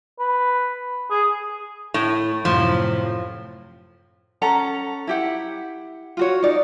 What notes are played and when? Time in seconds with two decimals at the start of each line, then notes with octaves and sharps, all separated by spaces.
0.20 B4
1.11 G#4
1.94 A2
2.45 F#2 A2 C3 F3
4.42 C#4 A4 F#5 A#5
5.07 E4 G4 F#5
6.17 F4 F#4 C#5
6.43 D#4 D5